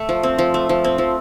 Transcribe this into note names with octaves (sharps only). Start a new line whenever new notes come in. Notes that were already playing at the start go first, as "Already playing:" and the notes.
Already playing: A3
F3
C4
F3
A3
F3
C4
F3